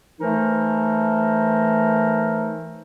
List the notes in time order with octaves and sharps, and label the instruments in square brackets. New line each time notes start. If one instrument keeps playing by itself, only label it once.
[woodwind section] E3 A3 D#4 A#4 C5